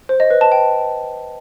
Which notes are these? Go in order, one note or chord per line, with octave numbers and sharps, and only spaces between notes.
C5
D#5
B4
A5
G5